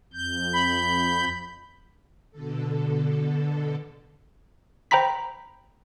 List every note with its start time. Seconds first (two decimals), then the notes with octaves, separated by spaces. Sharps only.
0.13 F2 G6
0.53 B5
2.31 B2 D3 A4
4.91 C5 G5 A#5 B5 B6